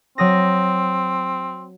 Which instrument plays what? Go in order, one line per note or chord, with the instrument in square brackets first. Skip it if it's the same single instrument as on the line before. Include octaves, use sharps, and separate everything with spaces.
[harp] F#3 D#6 A#6 [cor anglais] C4